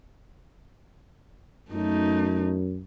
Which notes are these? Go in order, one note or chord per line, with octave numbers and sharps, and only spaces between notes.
F#2 A3 D#4